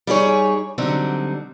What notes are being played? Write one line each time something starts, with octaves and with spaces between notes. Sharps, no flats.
G3 D#4 G#4 C#5
D3 F#3 G3 C4 D#4